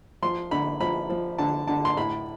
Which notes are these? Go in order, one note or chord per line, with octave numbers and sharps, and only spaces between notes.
F3 C6
D3 B5
F3 B5
F3
D3 A5
D3 A5
C6
A2 B5